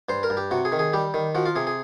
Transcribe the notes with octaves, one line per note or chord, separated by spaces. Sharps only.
G2 C5
A#4
G2
G4
C3 F#4
G#4
D#3
G#4
G3 G4
D#3
F3 F#4
F4
C3 G#4
G#4